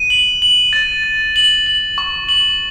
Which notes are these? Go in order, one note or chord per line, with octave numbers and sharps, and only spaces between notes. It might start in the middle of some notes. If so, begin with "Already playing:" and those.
Already playing: D#7
F#7
F#7
A6
A6
F#7
F#7
C#6
F#7